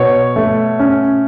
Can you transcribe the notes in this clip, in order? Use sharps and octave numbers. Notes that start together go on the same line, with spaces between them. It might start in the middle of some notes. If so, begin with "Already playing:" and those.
Already playing: B2 C#5
A3
C#4